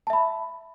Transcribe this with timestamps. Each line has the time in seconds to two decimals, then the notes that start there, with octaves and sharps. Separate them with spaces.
0.07 A5
0.10 E5
0.13 B5